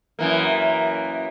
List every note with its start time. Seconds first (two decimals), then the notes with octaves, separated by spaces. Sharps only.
0.19 F#2 E3 A#3